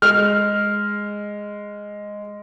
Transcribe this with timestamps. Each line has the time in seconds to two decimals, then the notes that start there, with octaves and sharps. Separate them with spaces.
0.02 G#3 F6